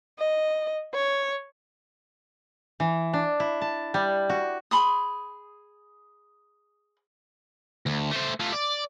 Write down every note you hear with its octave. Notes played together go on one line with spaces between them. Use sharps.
D#5
C#5
E3
D4
E4
A5
G3
F#4
G#4 B5 C6 D#6
D2
A3 C5
A3 F4
D5